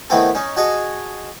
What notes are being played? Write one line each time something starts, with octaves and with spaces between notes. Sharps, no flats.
D#3 E3 A3 B3 C4 A4
C#4 D#4
F#4 G#4 D#5 G#5 A5 C#6